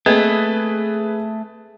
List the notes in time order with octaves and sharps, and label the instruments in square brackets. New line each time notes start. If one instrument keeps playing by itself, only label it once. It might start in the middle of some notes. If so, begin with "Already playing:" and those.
[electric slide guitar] A3 [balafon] A#3 C4 D#5 [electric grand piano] G#4 B4